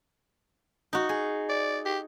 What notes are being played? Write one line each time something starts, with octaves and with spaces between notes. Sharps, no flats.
D#4 F#4
G#4
D5
G4